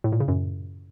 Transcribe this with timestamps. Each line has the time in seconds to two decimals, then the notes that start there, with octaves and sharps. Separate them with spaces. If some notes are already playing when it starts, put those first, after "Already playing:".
0.04 A2
0.12 A#2
0.20 C#3
0.28 F#2